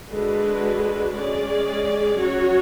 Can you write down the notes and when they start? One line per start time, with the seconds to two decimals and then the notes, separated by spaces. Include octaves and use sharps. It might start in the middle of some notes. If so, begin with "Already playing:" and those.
0.11 D3 G#3 D4 F#4 B4
1.13 G#3 C#4 G#4 D5
2.16 F#3 C#4 F#4 C#5